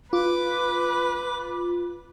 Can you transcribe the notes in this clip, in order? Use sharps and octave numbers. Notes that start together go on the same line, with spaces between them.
F4 B4 D6